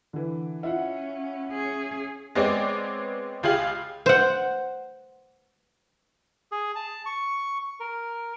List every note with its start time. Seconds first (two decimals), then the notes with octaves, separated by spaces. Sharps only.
0.13 D3 E3
0.63 C#4 E4 F4 F#5
1.49 C#4 G#4
2.35 G#3 B3 C4 G#4 C#5 D5
3.43 C#2 F4 G4 G#4 F5 F#7
4.06 C5 F#5
6.52 G#4
6.76 A5
7.06 C#6
7.80 A#4